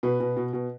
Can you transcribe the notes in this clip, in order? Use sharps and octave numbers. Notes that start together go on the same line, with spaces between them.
B2 B4
B2
B2
B2